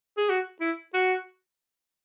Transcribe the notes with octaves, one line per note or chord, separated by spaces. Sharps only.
G#4
F#4
E4
F#4